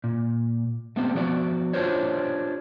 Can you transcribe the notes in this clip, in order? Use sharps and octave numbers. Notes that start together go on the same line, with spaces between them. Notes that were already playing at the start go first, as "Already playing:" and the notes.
A#2
A3 B3 C4 G4
F3 B3 F#4 D5
D4 F4 G4 A#4 C5 C#5